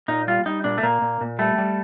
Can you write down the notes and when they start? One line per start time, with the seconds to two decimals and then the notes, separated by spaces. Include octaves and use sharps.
0.08 A#2 D#4
0.27 G3 F4
0.46 G3 D#4
0.64 A#2 D4
0.78 A3
0.83 A#2 A#3
1.02 A#2
1.21 A#2
1.39 G3 A3
1.58 G3